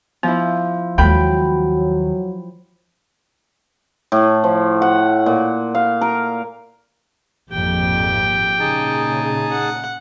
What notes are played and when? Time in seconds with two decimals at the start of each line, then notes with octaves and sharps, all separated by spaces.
0.23 F3 B3 E4
0.98 D#2 F#3 G#3 A#3 A4 G5 B5
4.12 A2
4.44 F3
4.82 F#5
5.26 A#2
5.75 F5
6.01 A#4
7.51 G#1 F2 A#2 G4 G5
8.60 A#2 C#3 D#4 G#4 A5
9.50 F#5